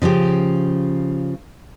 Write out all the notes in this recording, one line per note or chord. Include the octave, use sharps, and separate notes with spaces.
C#3 F3 C#4 G4